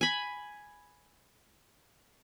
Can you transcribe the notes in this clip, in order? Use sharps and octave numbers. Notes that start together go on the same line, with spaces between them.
G#5 B5